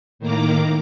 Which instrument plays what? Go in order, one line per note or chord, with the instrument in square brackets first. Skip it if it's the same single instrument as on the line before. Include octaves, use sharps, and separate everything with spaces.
[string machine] A2 D#3 A#3 A#5 D6